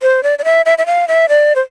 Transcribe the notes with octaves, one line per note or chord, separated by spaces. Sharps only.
C5
D5
D5
E5
E5
E5
F5
E5
D5
C5